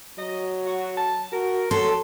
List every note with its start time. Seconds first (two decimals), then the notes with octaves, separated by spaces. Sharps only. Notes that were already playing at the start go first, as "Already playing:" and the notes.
0.18 F#3 D#5
0.66 F#4
0.97 A5
1.33 F#4 A#4
1.71 F#3 A4 C6